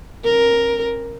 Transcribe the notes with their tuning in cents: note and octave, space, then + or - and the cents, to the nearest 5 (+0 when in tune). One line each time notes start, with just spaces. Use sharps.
C#4 -45 A#4 +5